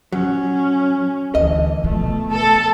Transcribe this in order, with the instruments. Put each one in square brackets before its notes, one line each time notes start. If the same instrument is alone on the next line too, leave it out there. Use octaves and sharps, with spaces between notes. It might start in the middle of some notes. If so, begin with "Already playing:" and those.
[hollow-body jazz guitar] F#3 [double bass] C#4
[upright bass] D2 [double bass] D3 E3 [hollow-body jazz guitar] D#5
[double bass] B2 A3 [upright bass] F3
[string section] A4